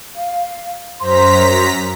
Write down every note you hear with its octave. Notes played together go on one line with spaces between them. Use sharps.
F5
F#2 C5 A#5 C6 B6